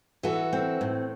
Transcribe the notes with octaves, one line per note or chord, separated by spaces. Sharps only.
E3 F#4 A4
C4
A2